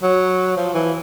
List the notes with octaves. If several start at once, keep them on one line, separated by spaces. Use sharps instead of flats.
F#3
F3
E3